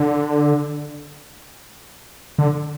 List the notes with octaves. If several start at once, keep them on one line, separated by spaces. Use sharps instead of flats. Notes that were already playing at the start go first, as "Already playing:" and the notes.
Already playing: D3
D3